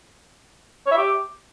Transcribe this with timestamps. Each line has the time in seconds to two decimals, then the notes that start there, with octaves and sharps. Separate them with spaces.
0.86 C#5
0.92 E5
0.97 G4